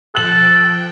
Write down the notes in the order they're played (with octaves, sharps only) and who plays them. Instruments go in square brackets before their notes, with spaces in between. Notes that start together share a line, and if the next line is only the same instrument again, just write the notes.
[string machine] F3 G5 [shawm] A4 [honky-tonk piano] F#6 F#7